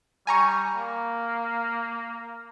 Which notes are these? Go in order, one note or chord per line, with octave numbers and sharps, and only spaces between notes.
G3 G#5 A#5 C#6
A#3